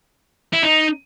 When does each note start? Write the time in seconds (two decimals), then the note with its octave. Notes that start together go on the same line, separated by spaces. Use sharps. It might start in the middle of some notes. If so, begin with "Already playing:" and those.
0.53 E4
0.63 D#4